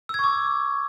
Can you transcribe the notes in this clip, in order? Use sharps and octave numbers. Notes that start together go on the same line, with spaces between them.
C#6 D6 E6 G#6